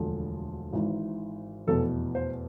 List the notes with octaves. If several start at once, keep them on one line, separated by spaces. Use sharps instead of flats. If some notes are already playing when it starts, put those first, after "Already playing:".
Already playing: E1 D2 D3 F3
G#1 G#2 E3
F1 E2 B2 A4
C5